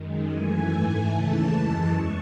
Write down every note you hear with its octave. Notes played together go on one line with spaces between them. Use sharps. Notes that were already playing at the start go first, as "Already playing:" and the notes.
Already playing: F#2 D#3 G#3
F#2 E3 A3 G#5
G#2 E3 A3 G#5
D#2 C#3 E3 A3 A5
F#2 E3 G#3
E2 C#6